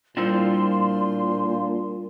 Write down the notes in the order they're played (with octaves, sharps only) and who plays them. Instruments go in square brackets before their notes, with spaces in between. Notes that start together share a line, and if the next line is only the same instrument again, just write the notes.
[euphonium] A#2 [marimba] G3 A#3 E4 [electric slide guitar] D4 F4 C5 [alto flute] C6